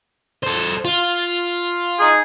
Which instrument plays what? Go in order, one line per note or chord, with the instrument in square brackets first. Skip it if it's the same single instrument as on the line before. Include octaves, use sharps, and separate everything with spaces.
[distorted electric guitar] A4 C5
F4
[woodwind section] D#4 G#4